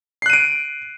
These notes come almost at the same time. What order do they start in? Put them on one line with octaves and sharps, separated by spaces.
C7 F#6 D#7 D7